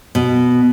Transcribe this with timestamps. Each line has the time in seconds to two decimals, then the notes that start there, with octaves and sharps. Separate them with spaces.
0.15 B2